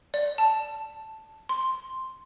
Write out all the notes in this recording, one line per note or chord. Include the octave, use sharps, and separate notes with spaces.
D5
A5
C6